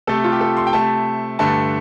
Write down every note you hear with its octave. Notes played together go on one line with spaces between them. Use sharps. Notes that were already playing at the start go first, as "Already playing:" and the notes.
C3 A3 A4
F4
G4
A4
C6
G5
C3 A3 A5
G2 D3 A3 A5